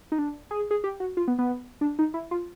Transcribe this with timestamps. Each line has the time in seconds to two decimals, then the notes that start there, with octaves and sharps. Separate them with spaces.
0.12 D#4
0.19 D4
0.51 G#4
0.71 G#4
0.84 G4
1.00 F#4
1.17 F4
1.28 B3
1.39 B3
1.81 D4
1.99 D#4
2.14 E4
2.31 F4